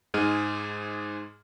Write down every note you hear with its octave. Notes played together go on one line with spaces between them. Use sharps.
G#2 G#3 G#4 F6 D#7